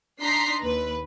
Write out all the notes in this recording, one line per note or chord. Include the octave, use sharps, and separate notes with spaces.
D4 D#4 A#5 C6 B6 C7
D#2 B4